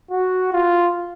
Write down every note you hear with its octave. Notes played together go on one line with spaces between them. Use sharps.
F#4
F4